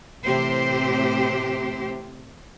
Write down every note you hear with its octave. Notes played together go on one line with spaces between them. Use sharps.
A2 C3 E3 C4 G4 C5